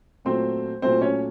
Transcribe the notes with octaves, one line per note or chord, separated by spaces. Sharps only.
A#2 F#3 A3 C4 C5
A#2 F#3 A3 C4 C5
C#4 C#5